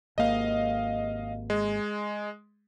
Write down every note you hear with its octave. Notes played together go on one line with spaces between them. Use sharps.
G#1 A#3 D#5 F5
G#3